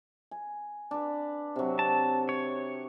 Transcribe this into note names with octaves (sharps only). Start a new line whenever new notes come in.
G#5
D4 B4
C3 F#3
A5
C#5